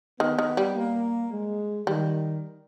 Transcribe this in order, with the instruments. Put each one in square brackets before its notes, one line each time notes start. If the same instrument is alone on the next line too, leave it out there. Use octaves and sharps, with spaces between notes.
[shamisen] D#3 [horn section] B3
[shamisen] D#3
G3
[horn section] A#3
G#3
[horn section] D#3 [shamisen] G3